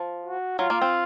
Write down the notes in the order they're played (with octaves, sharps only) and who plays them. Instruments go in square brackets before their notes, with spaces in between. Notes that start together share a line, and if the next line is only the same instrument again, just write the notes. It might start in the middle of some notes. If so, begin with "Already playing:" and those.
Already playing: [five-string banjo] F3
[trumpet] F#4
[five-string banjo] F#3 [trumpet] F4
[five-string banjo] A#3
C4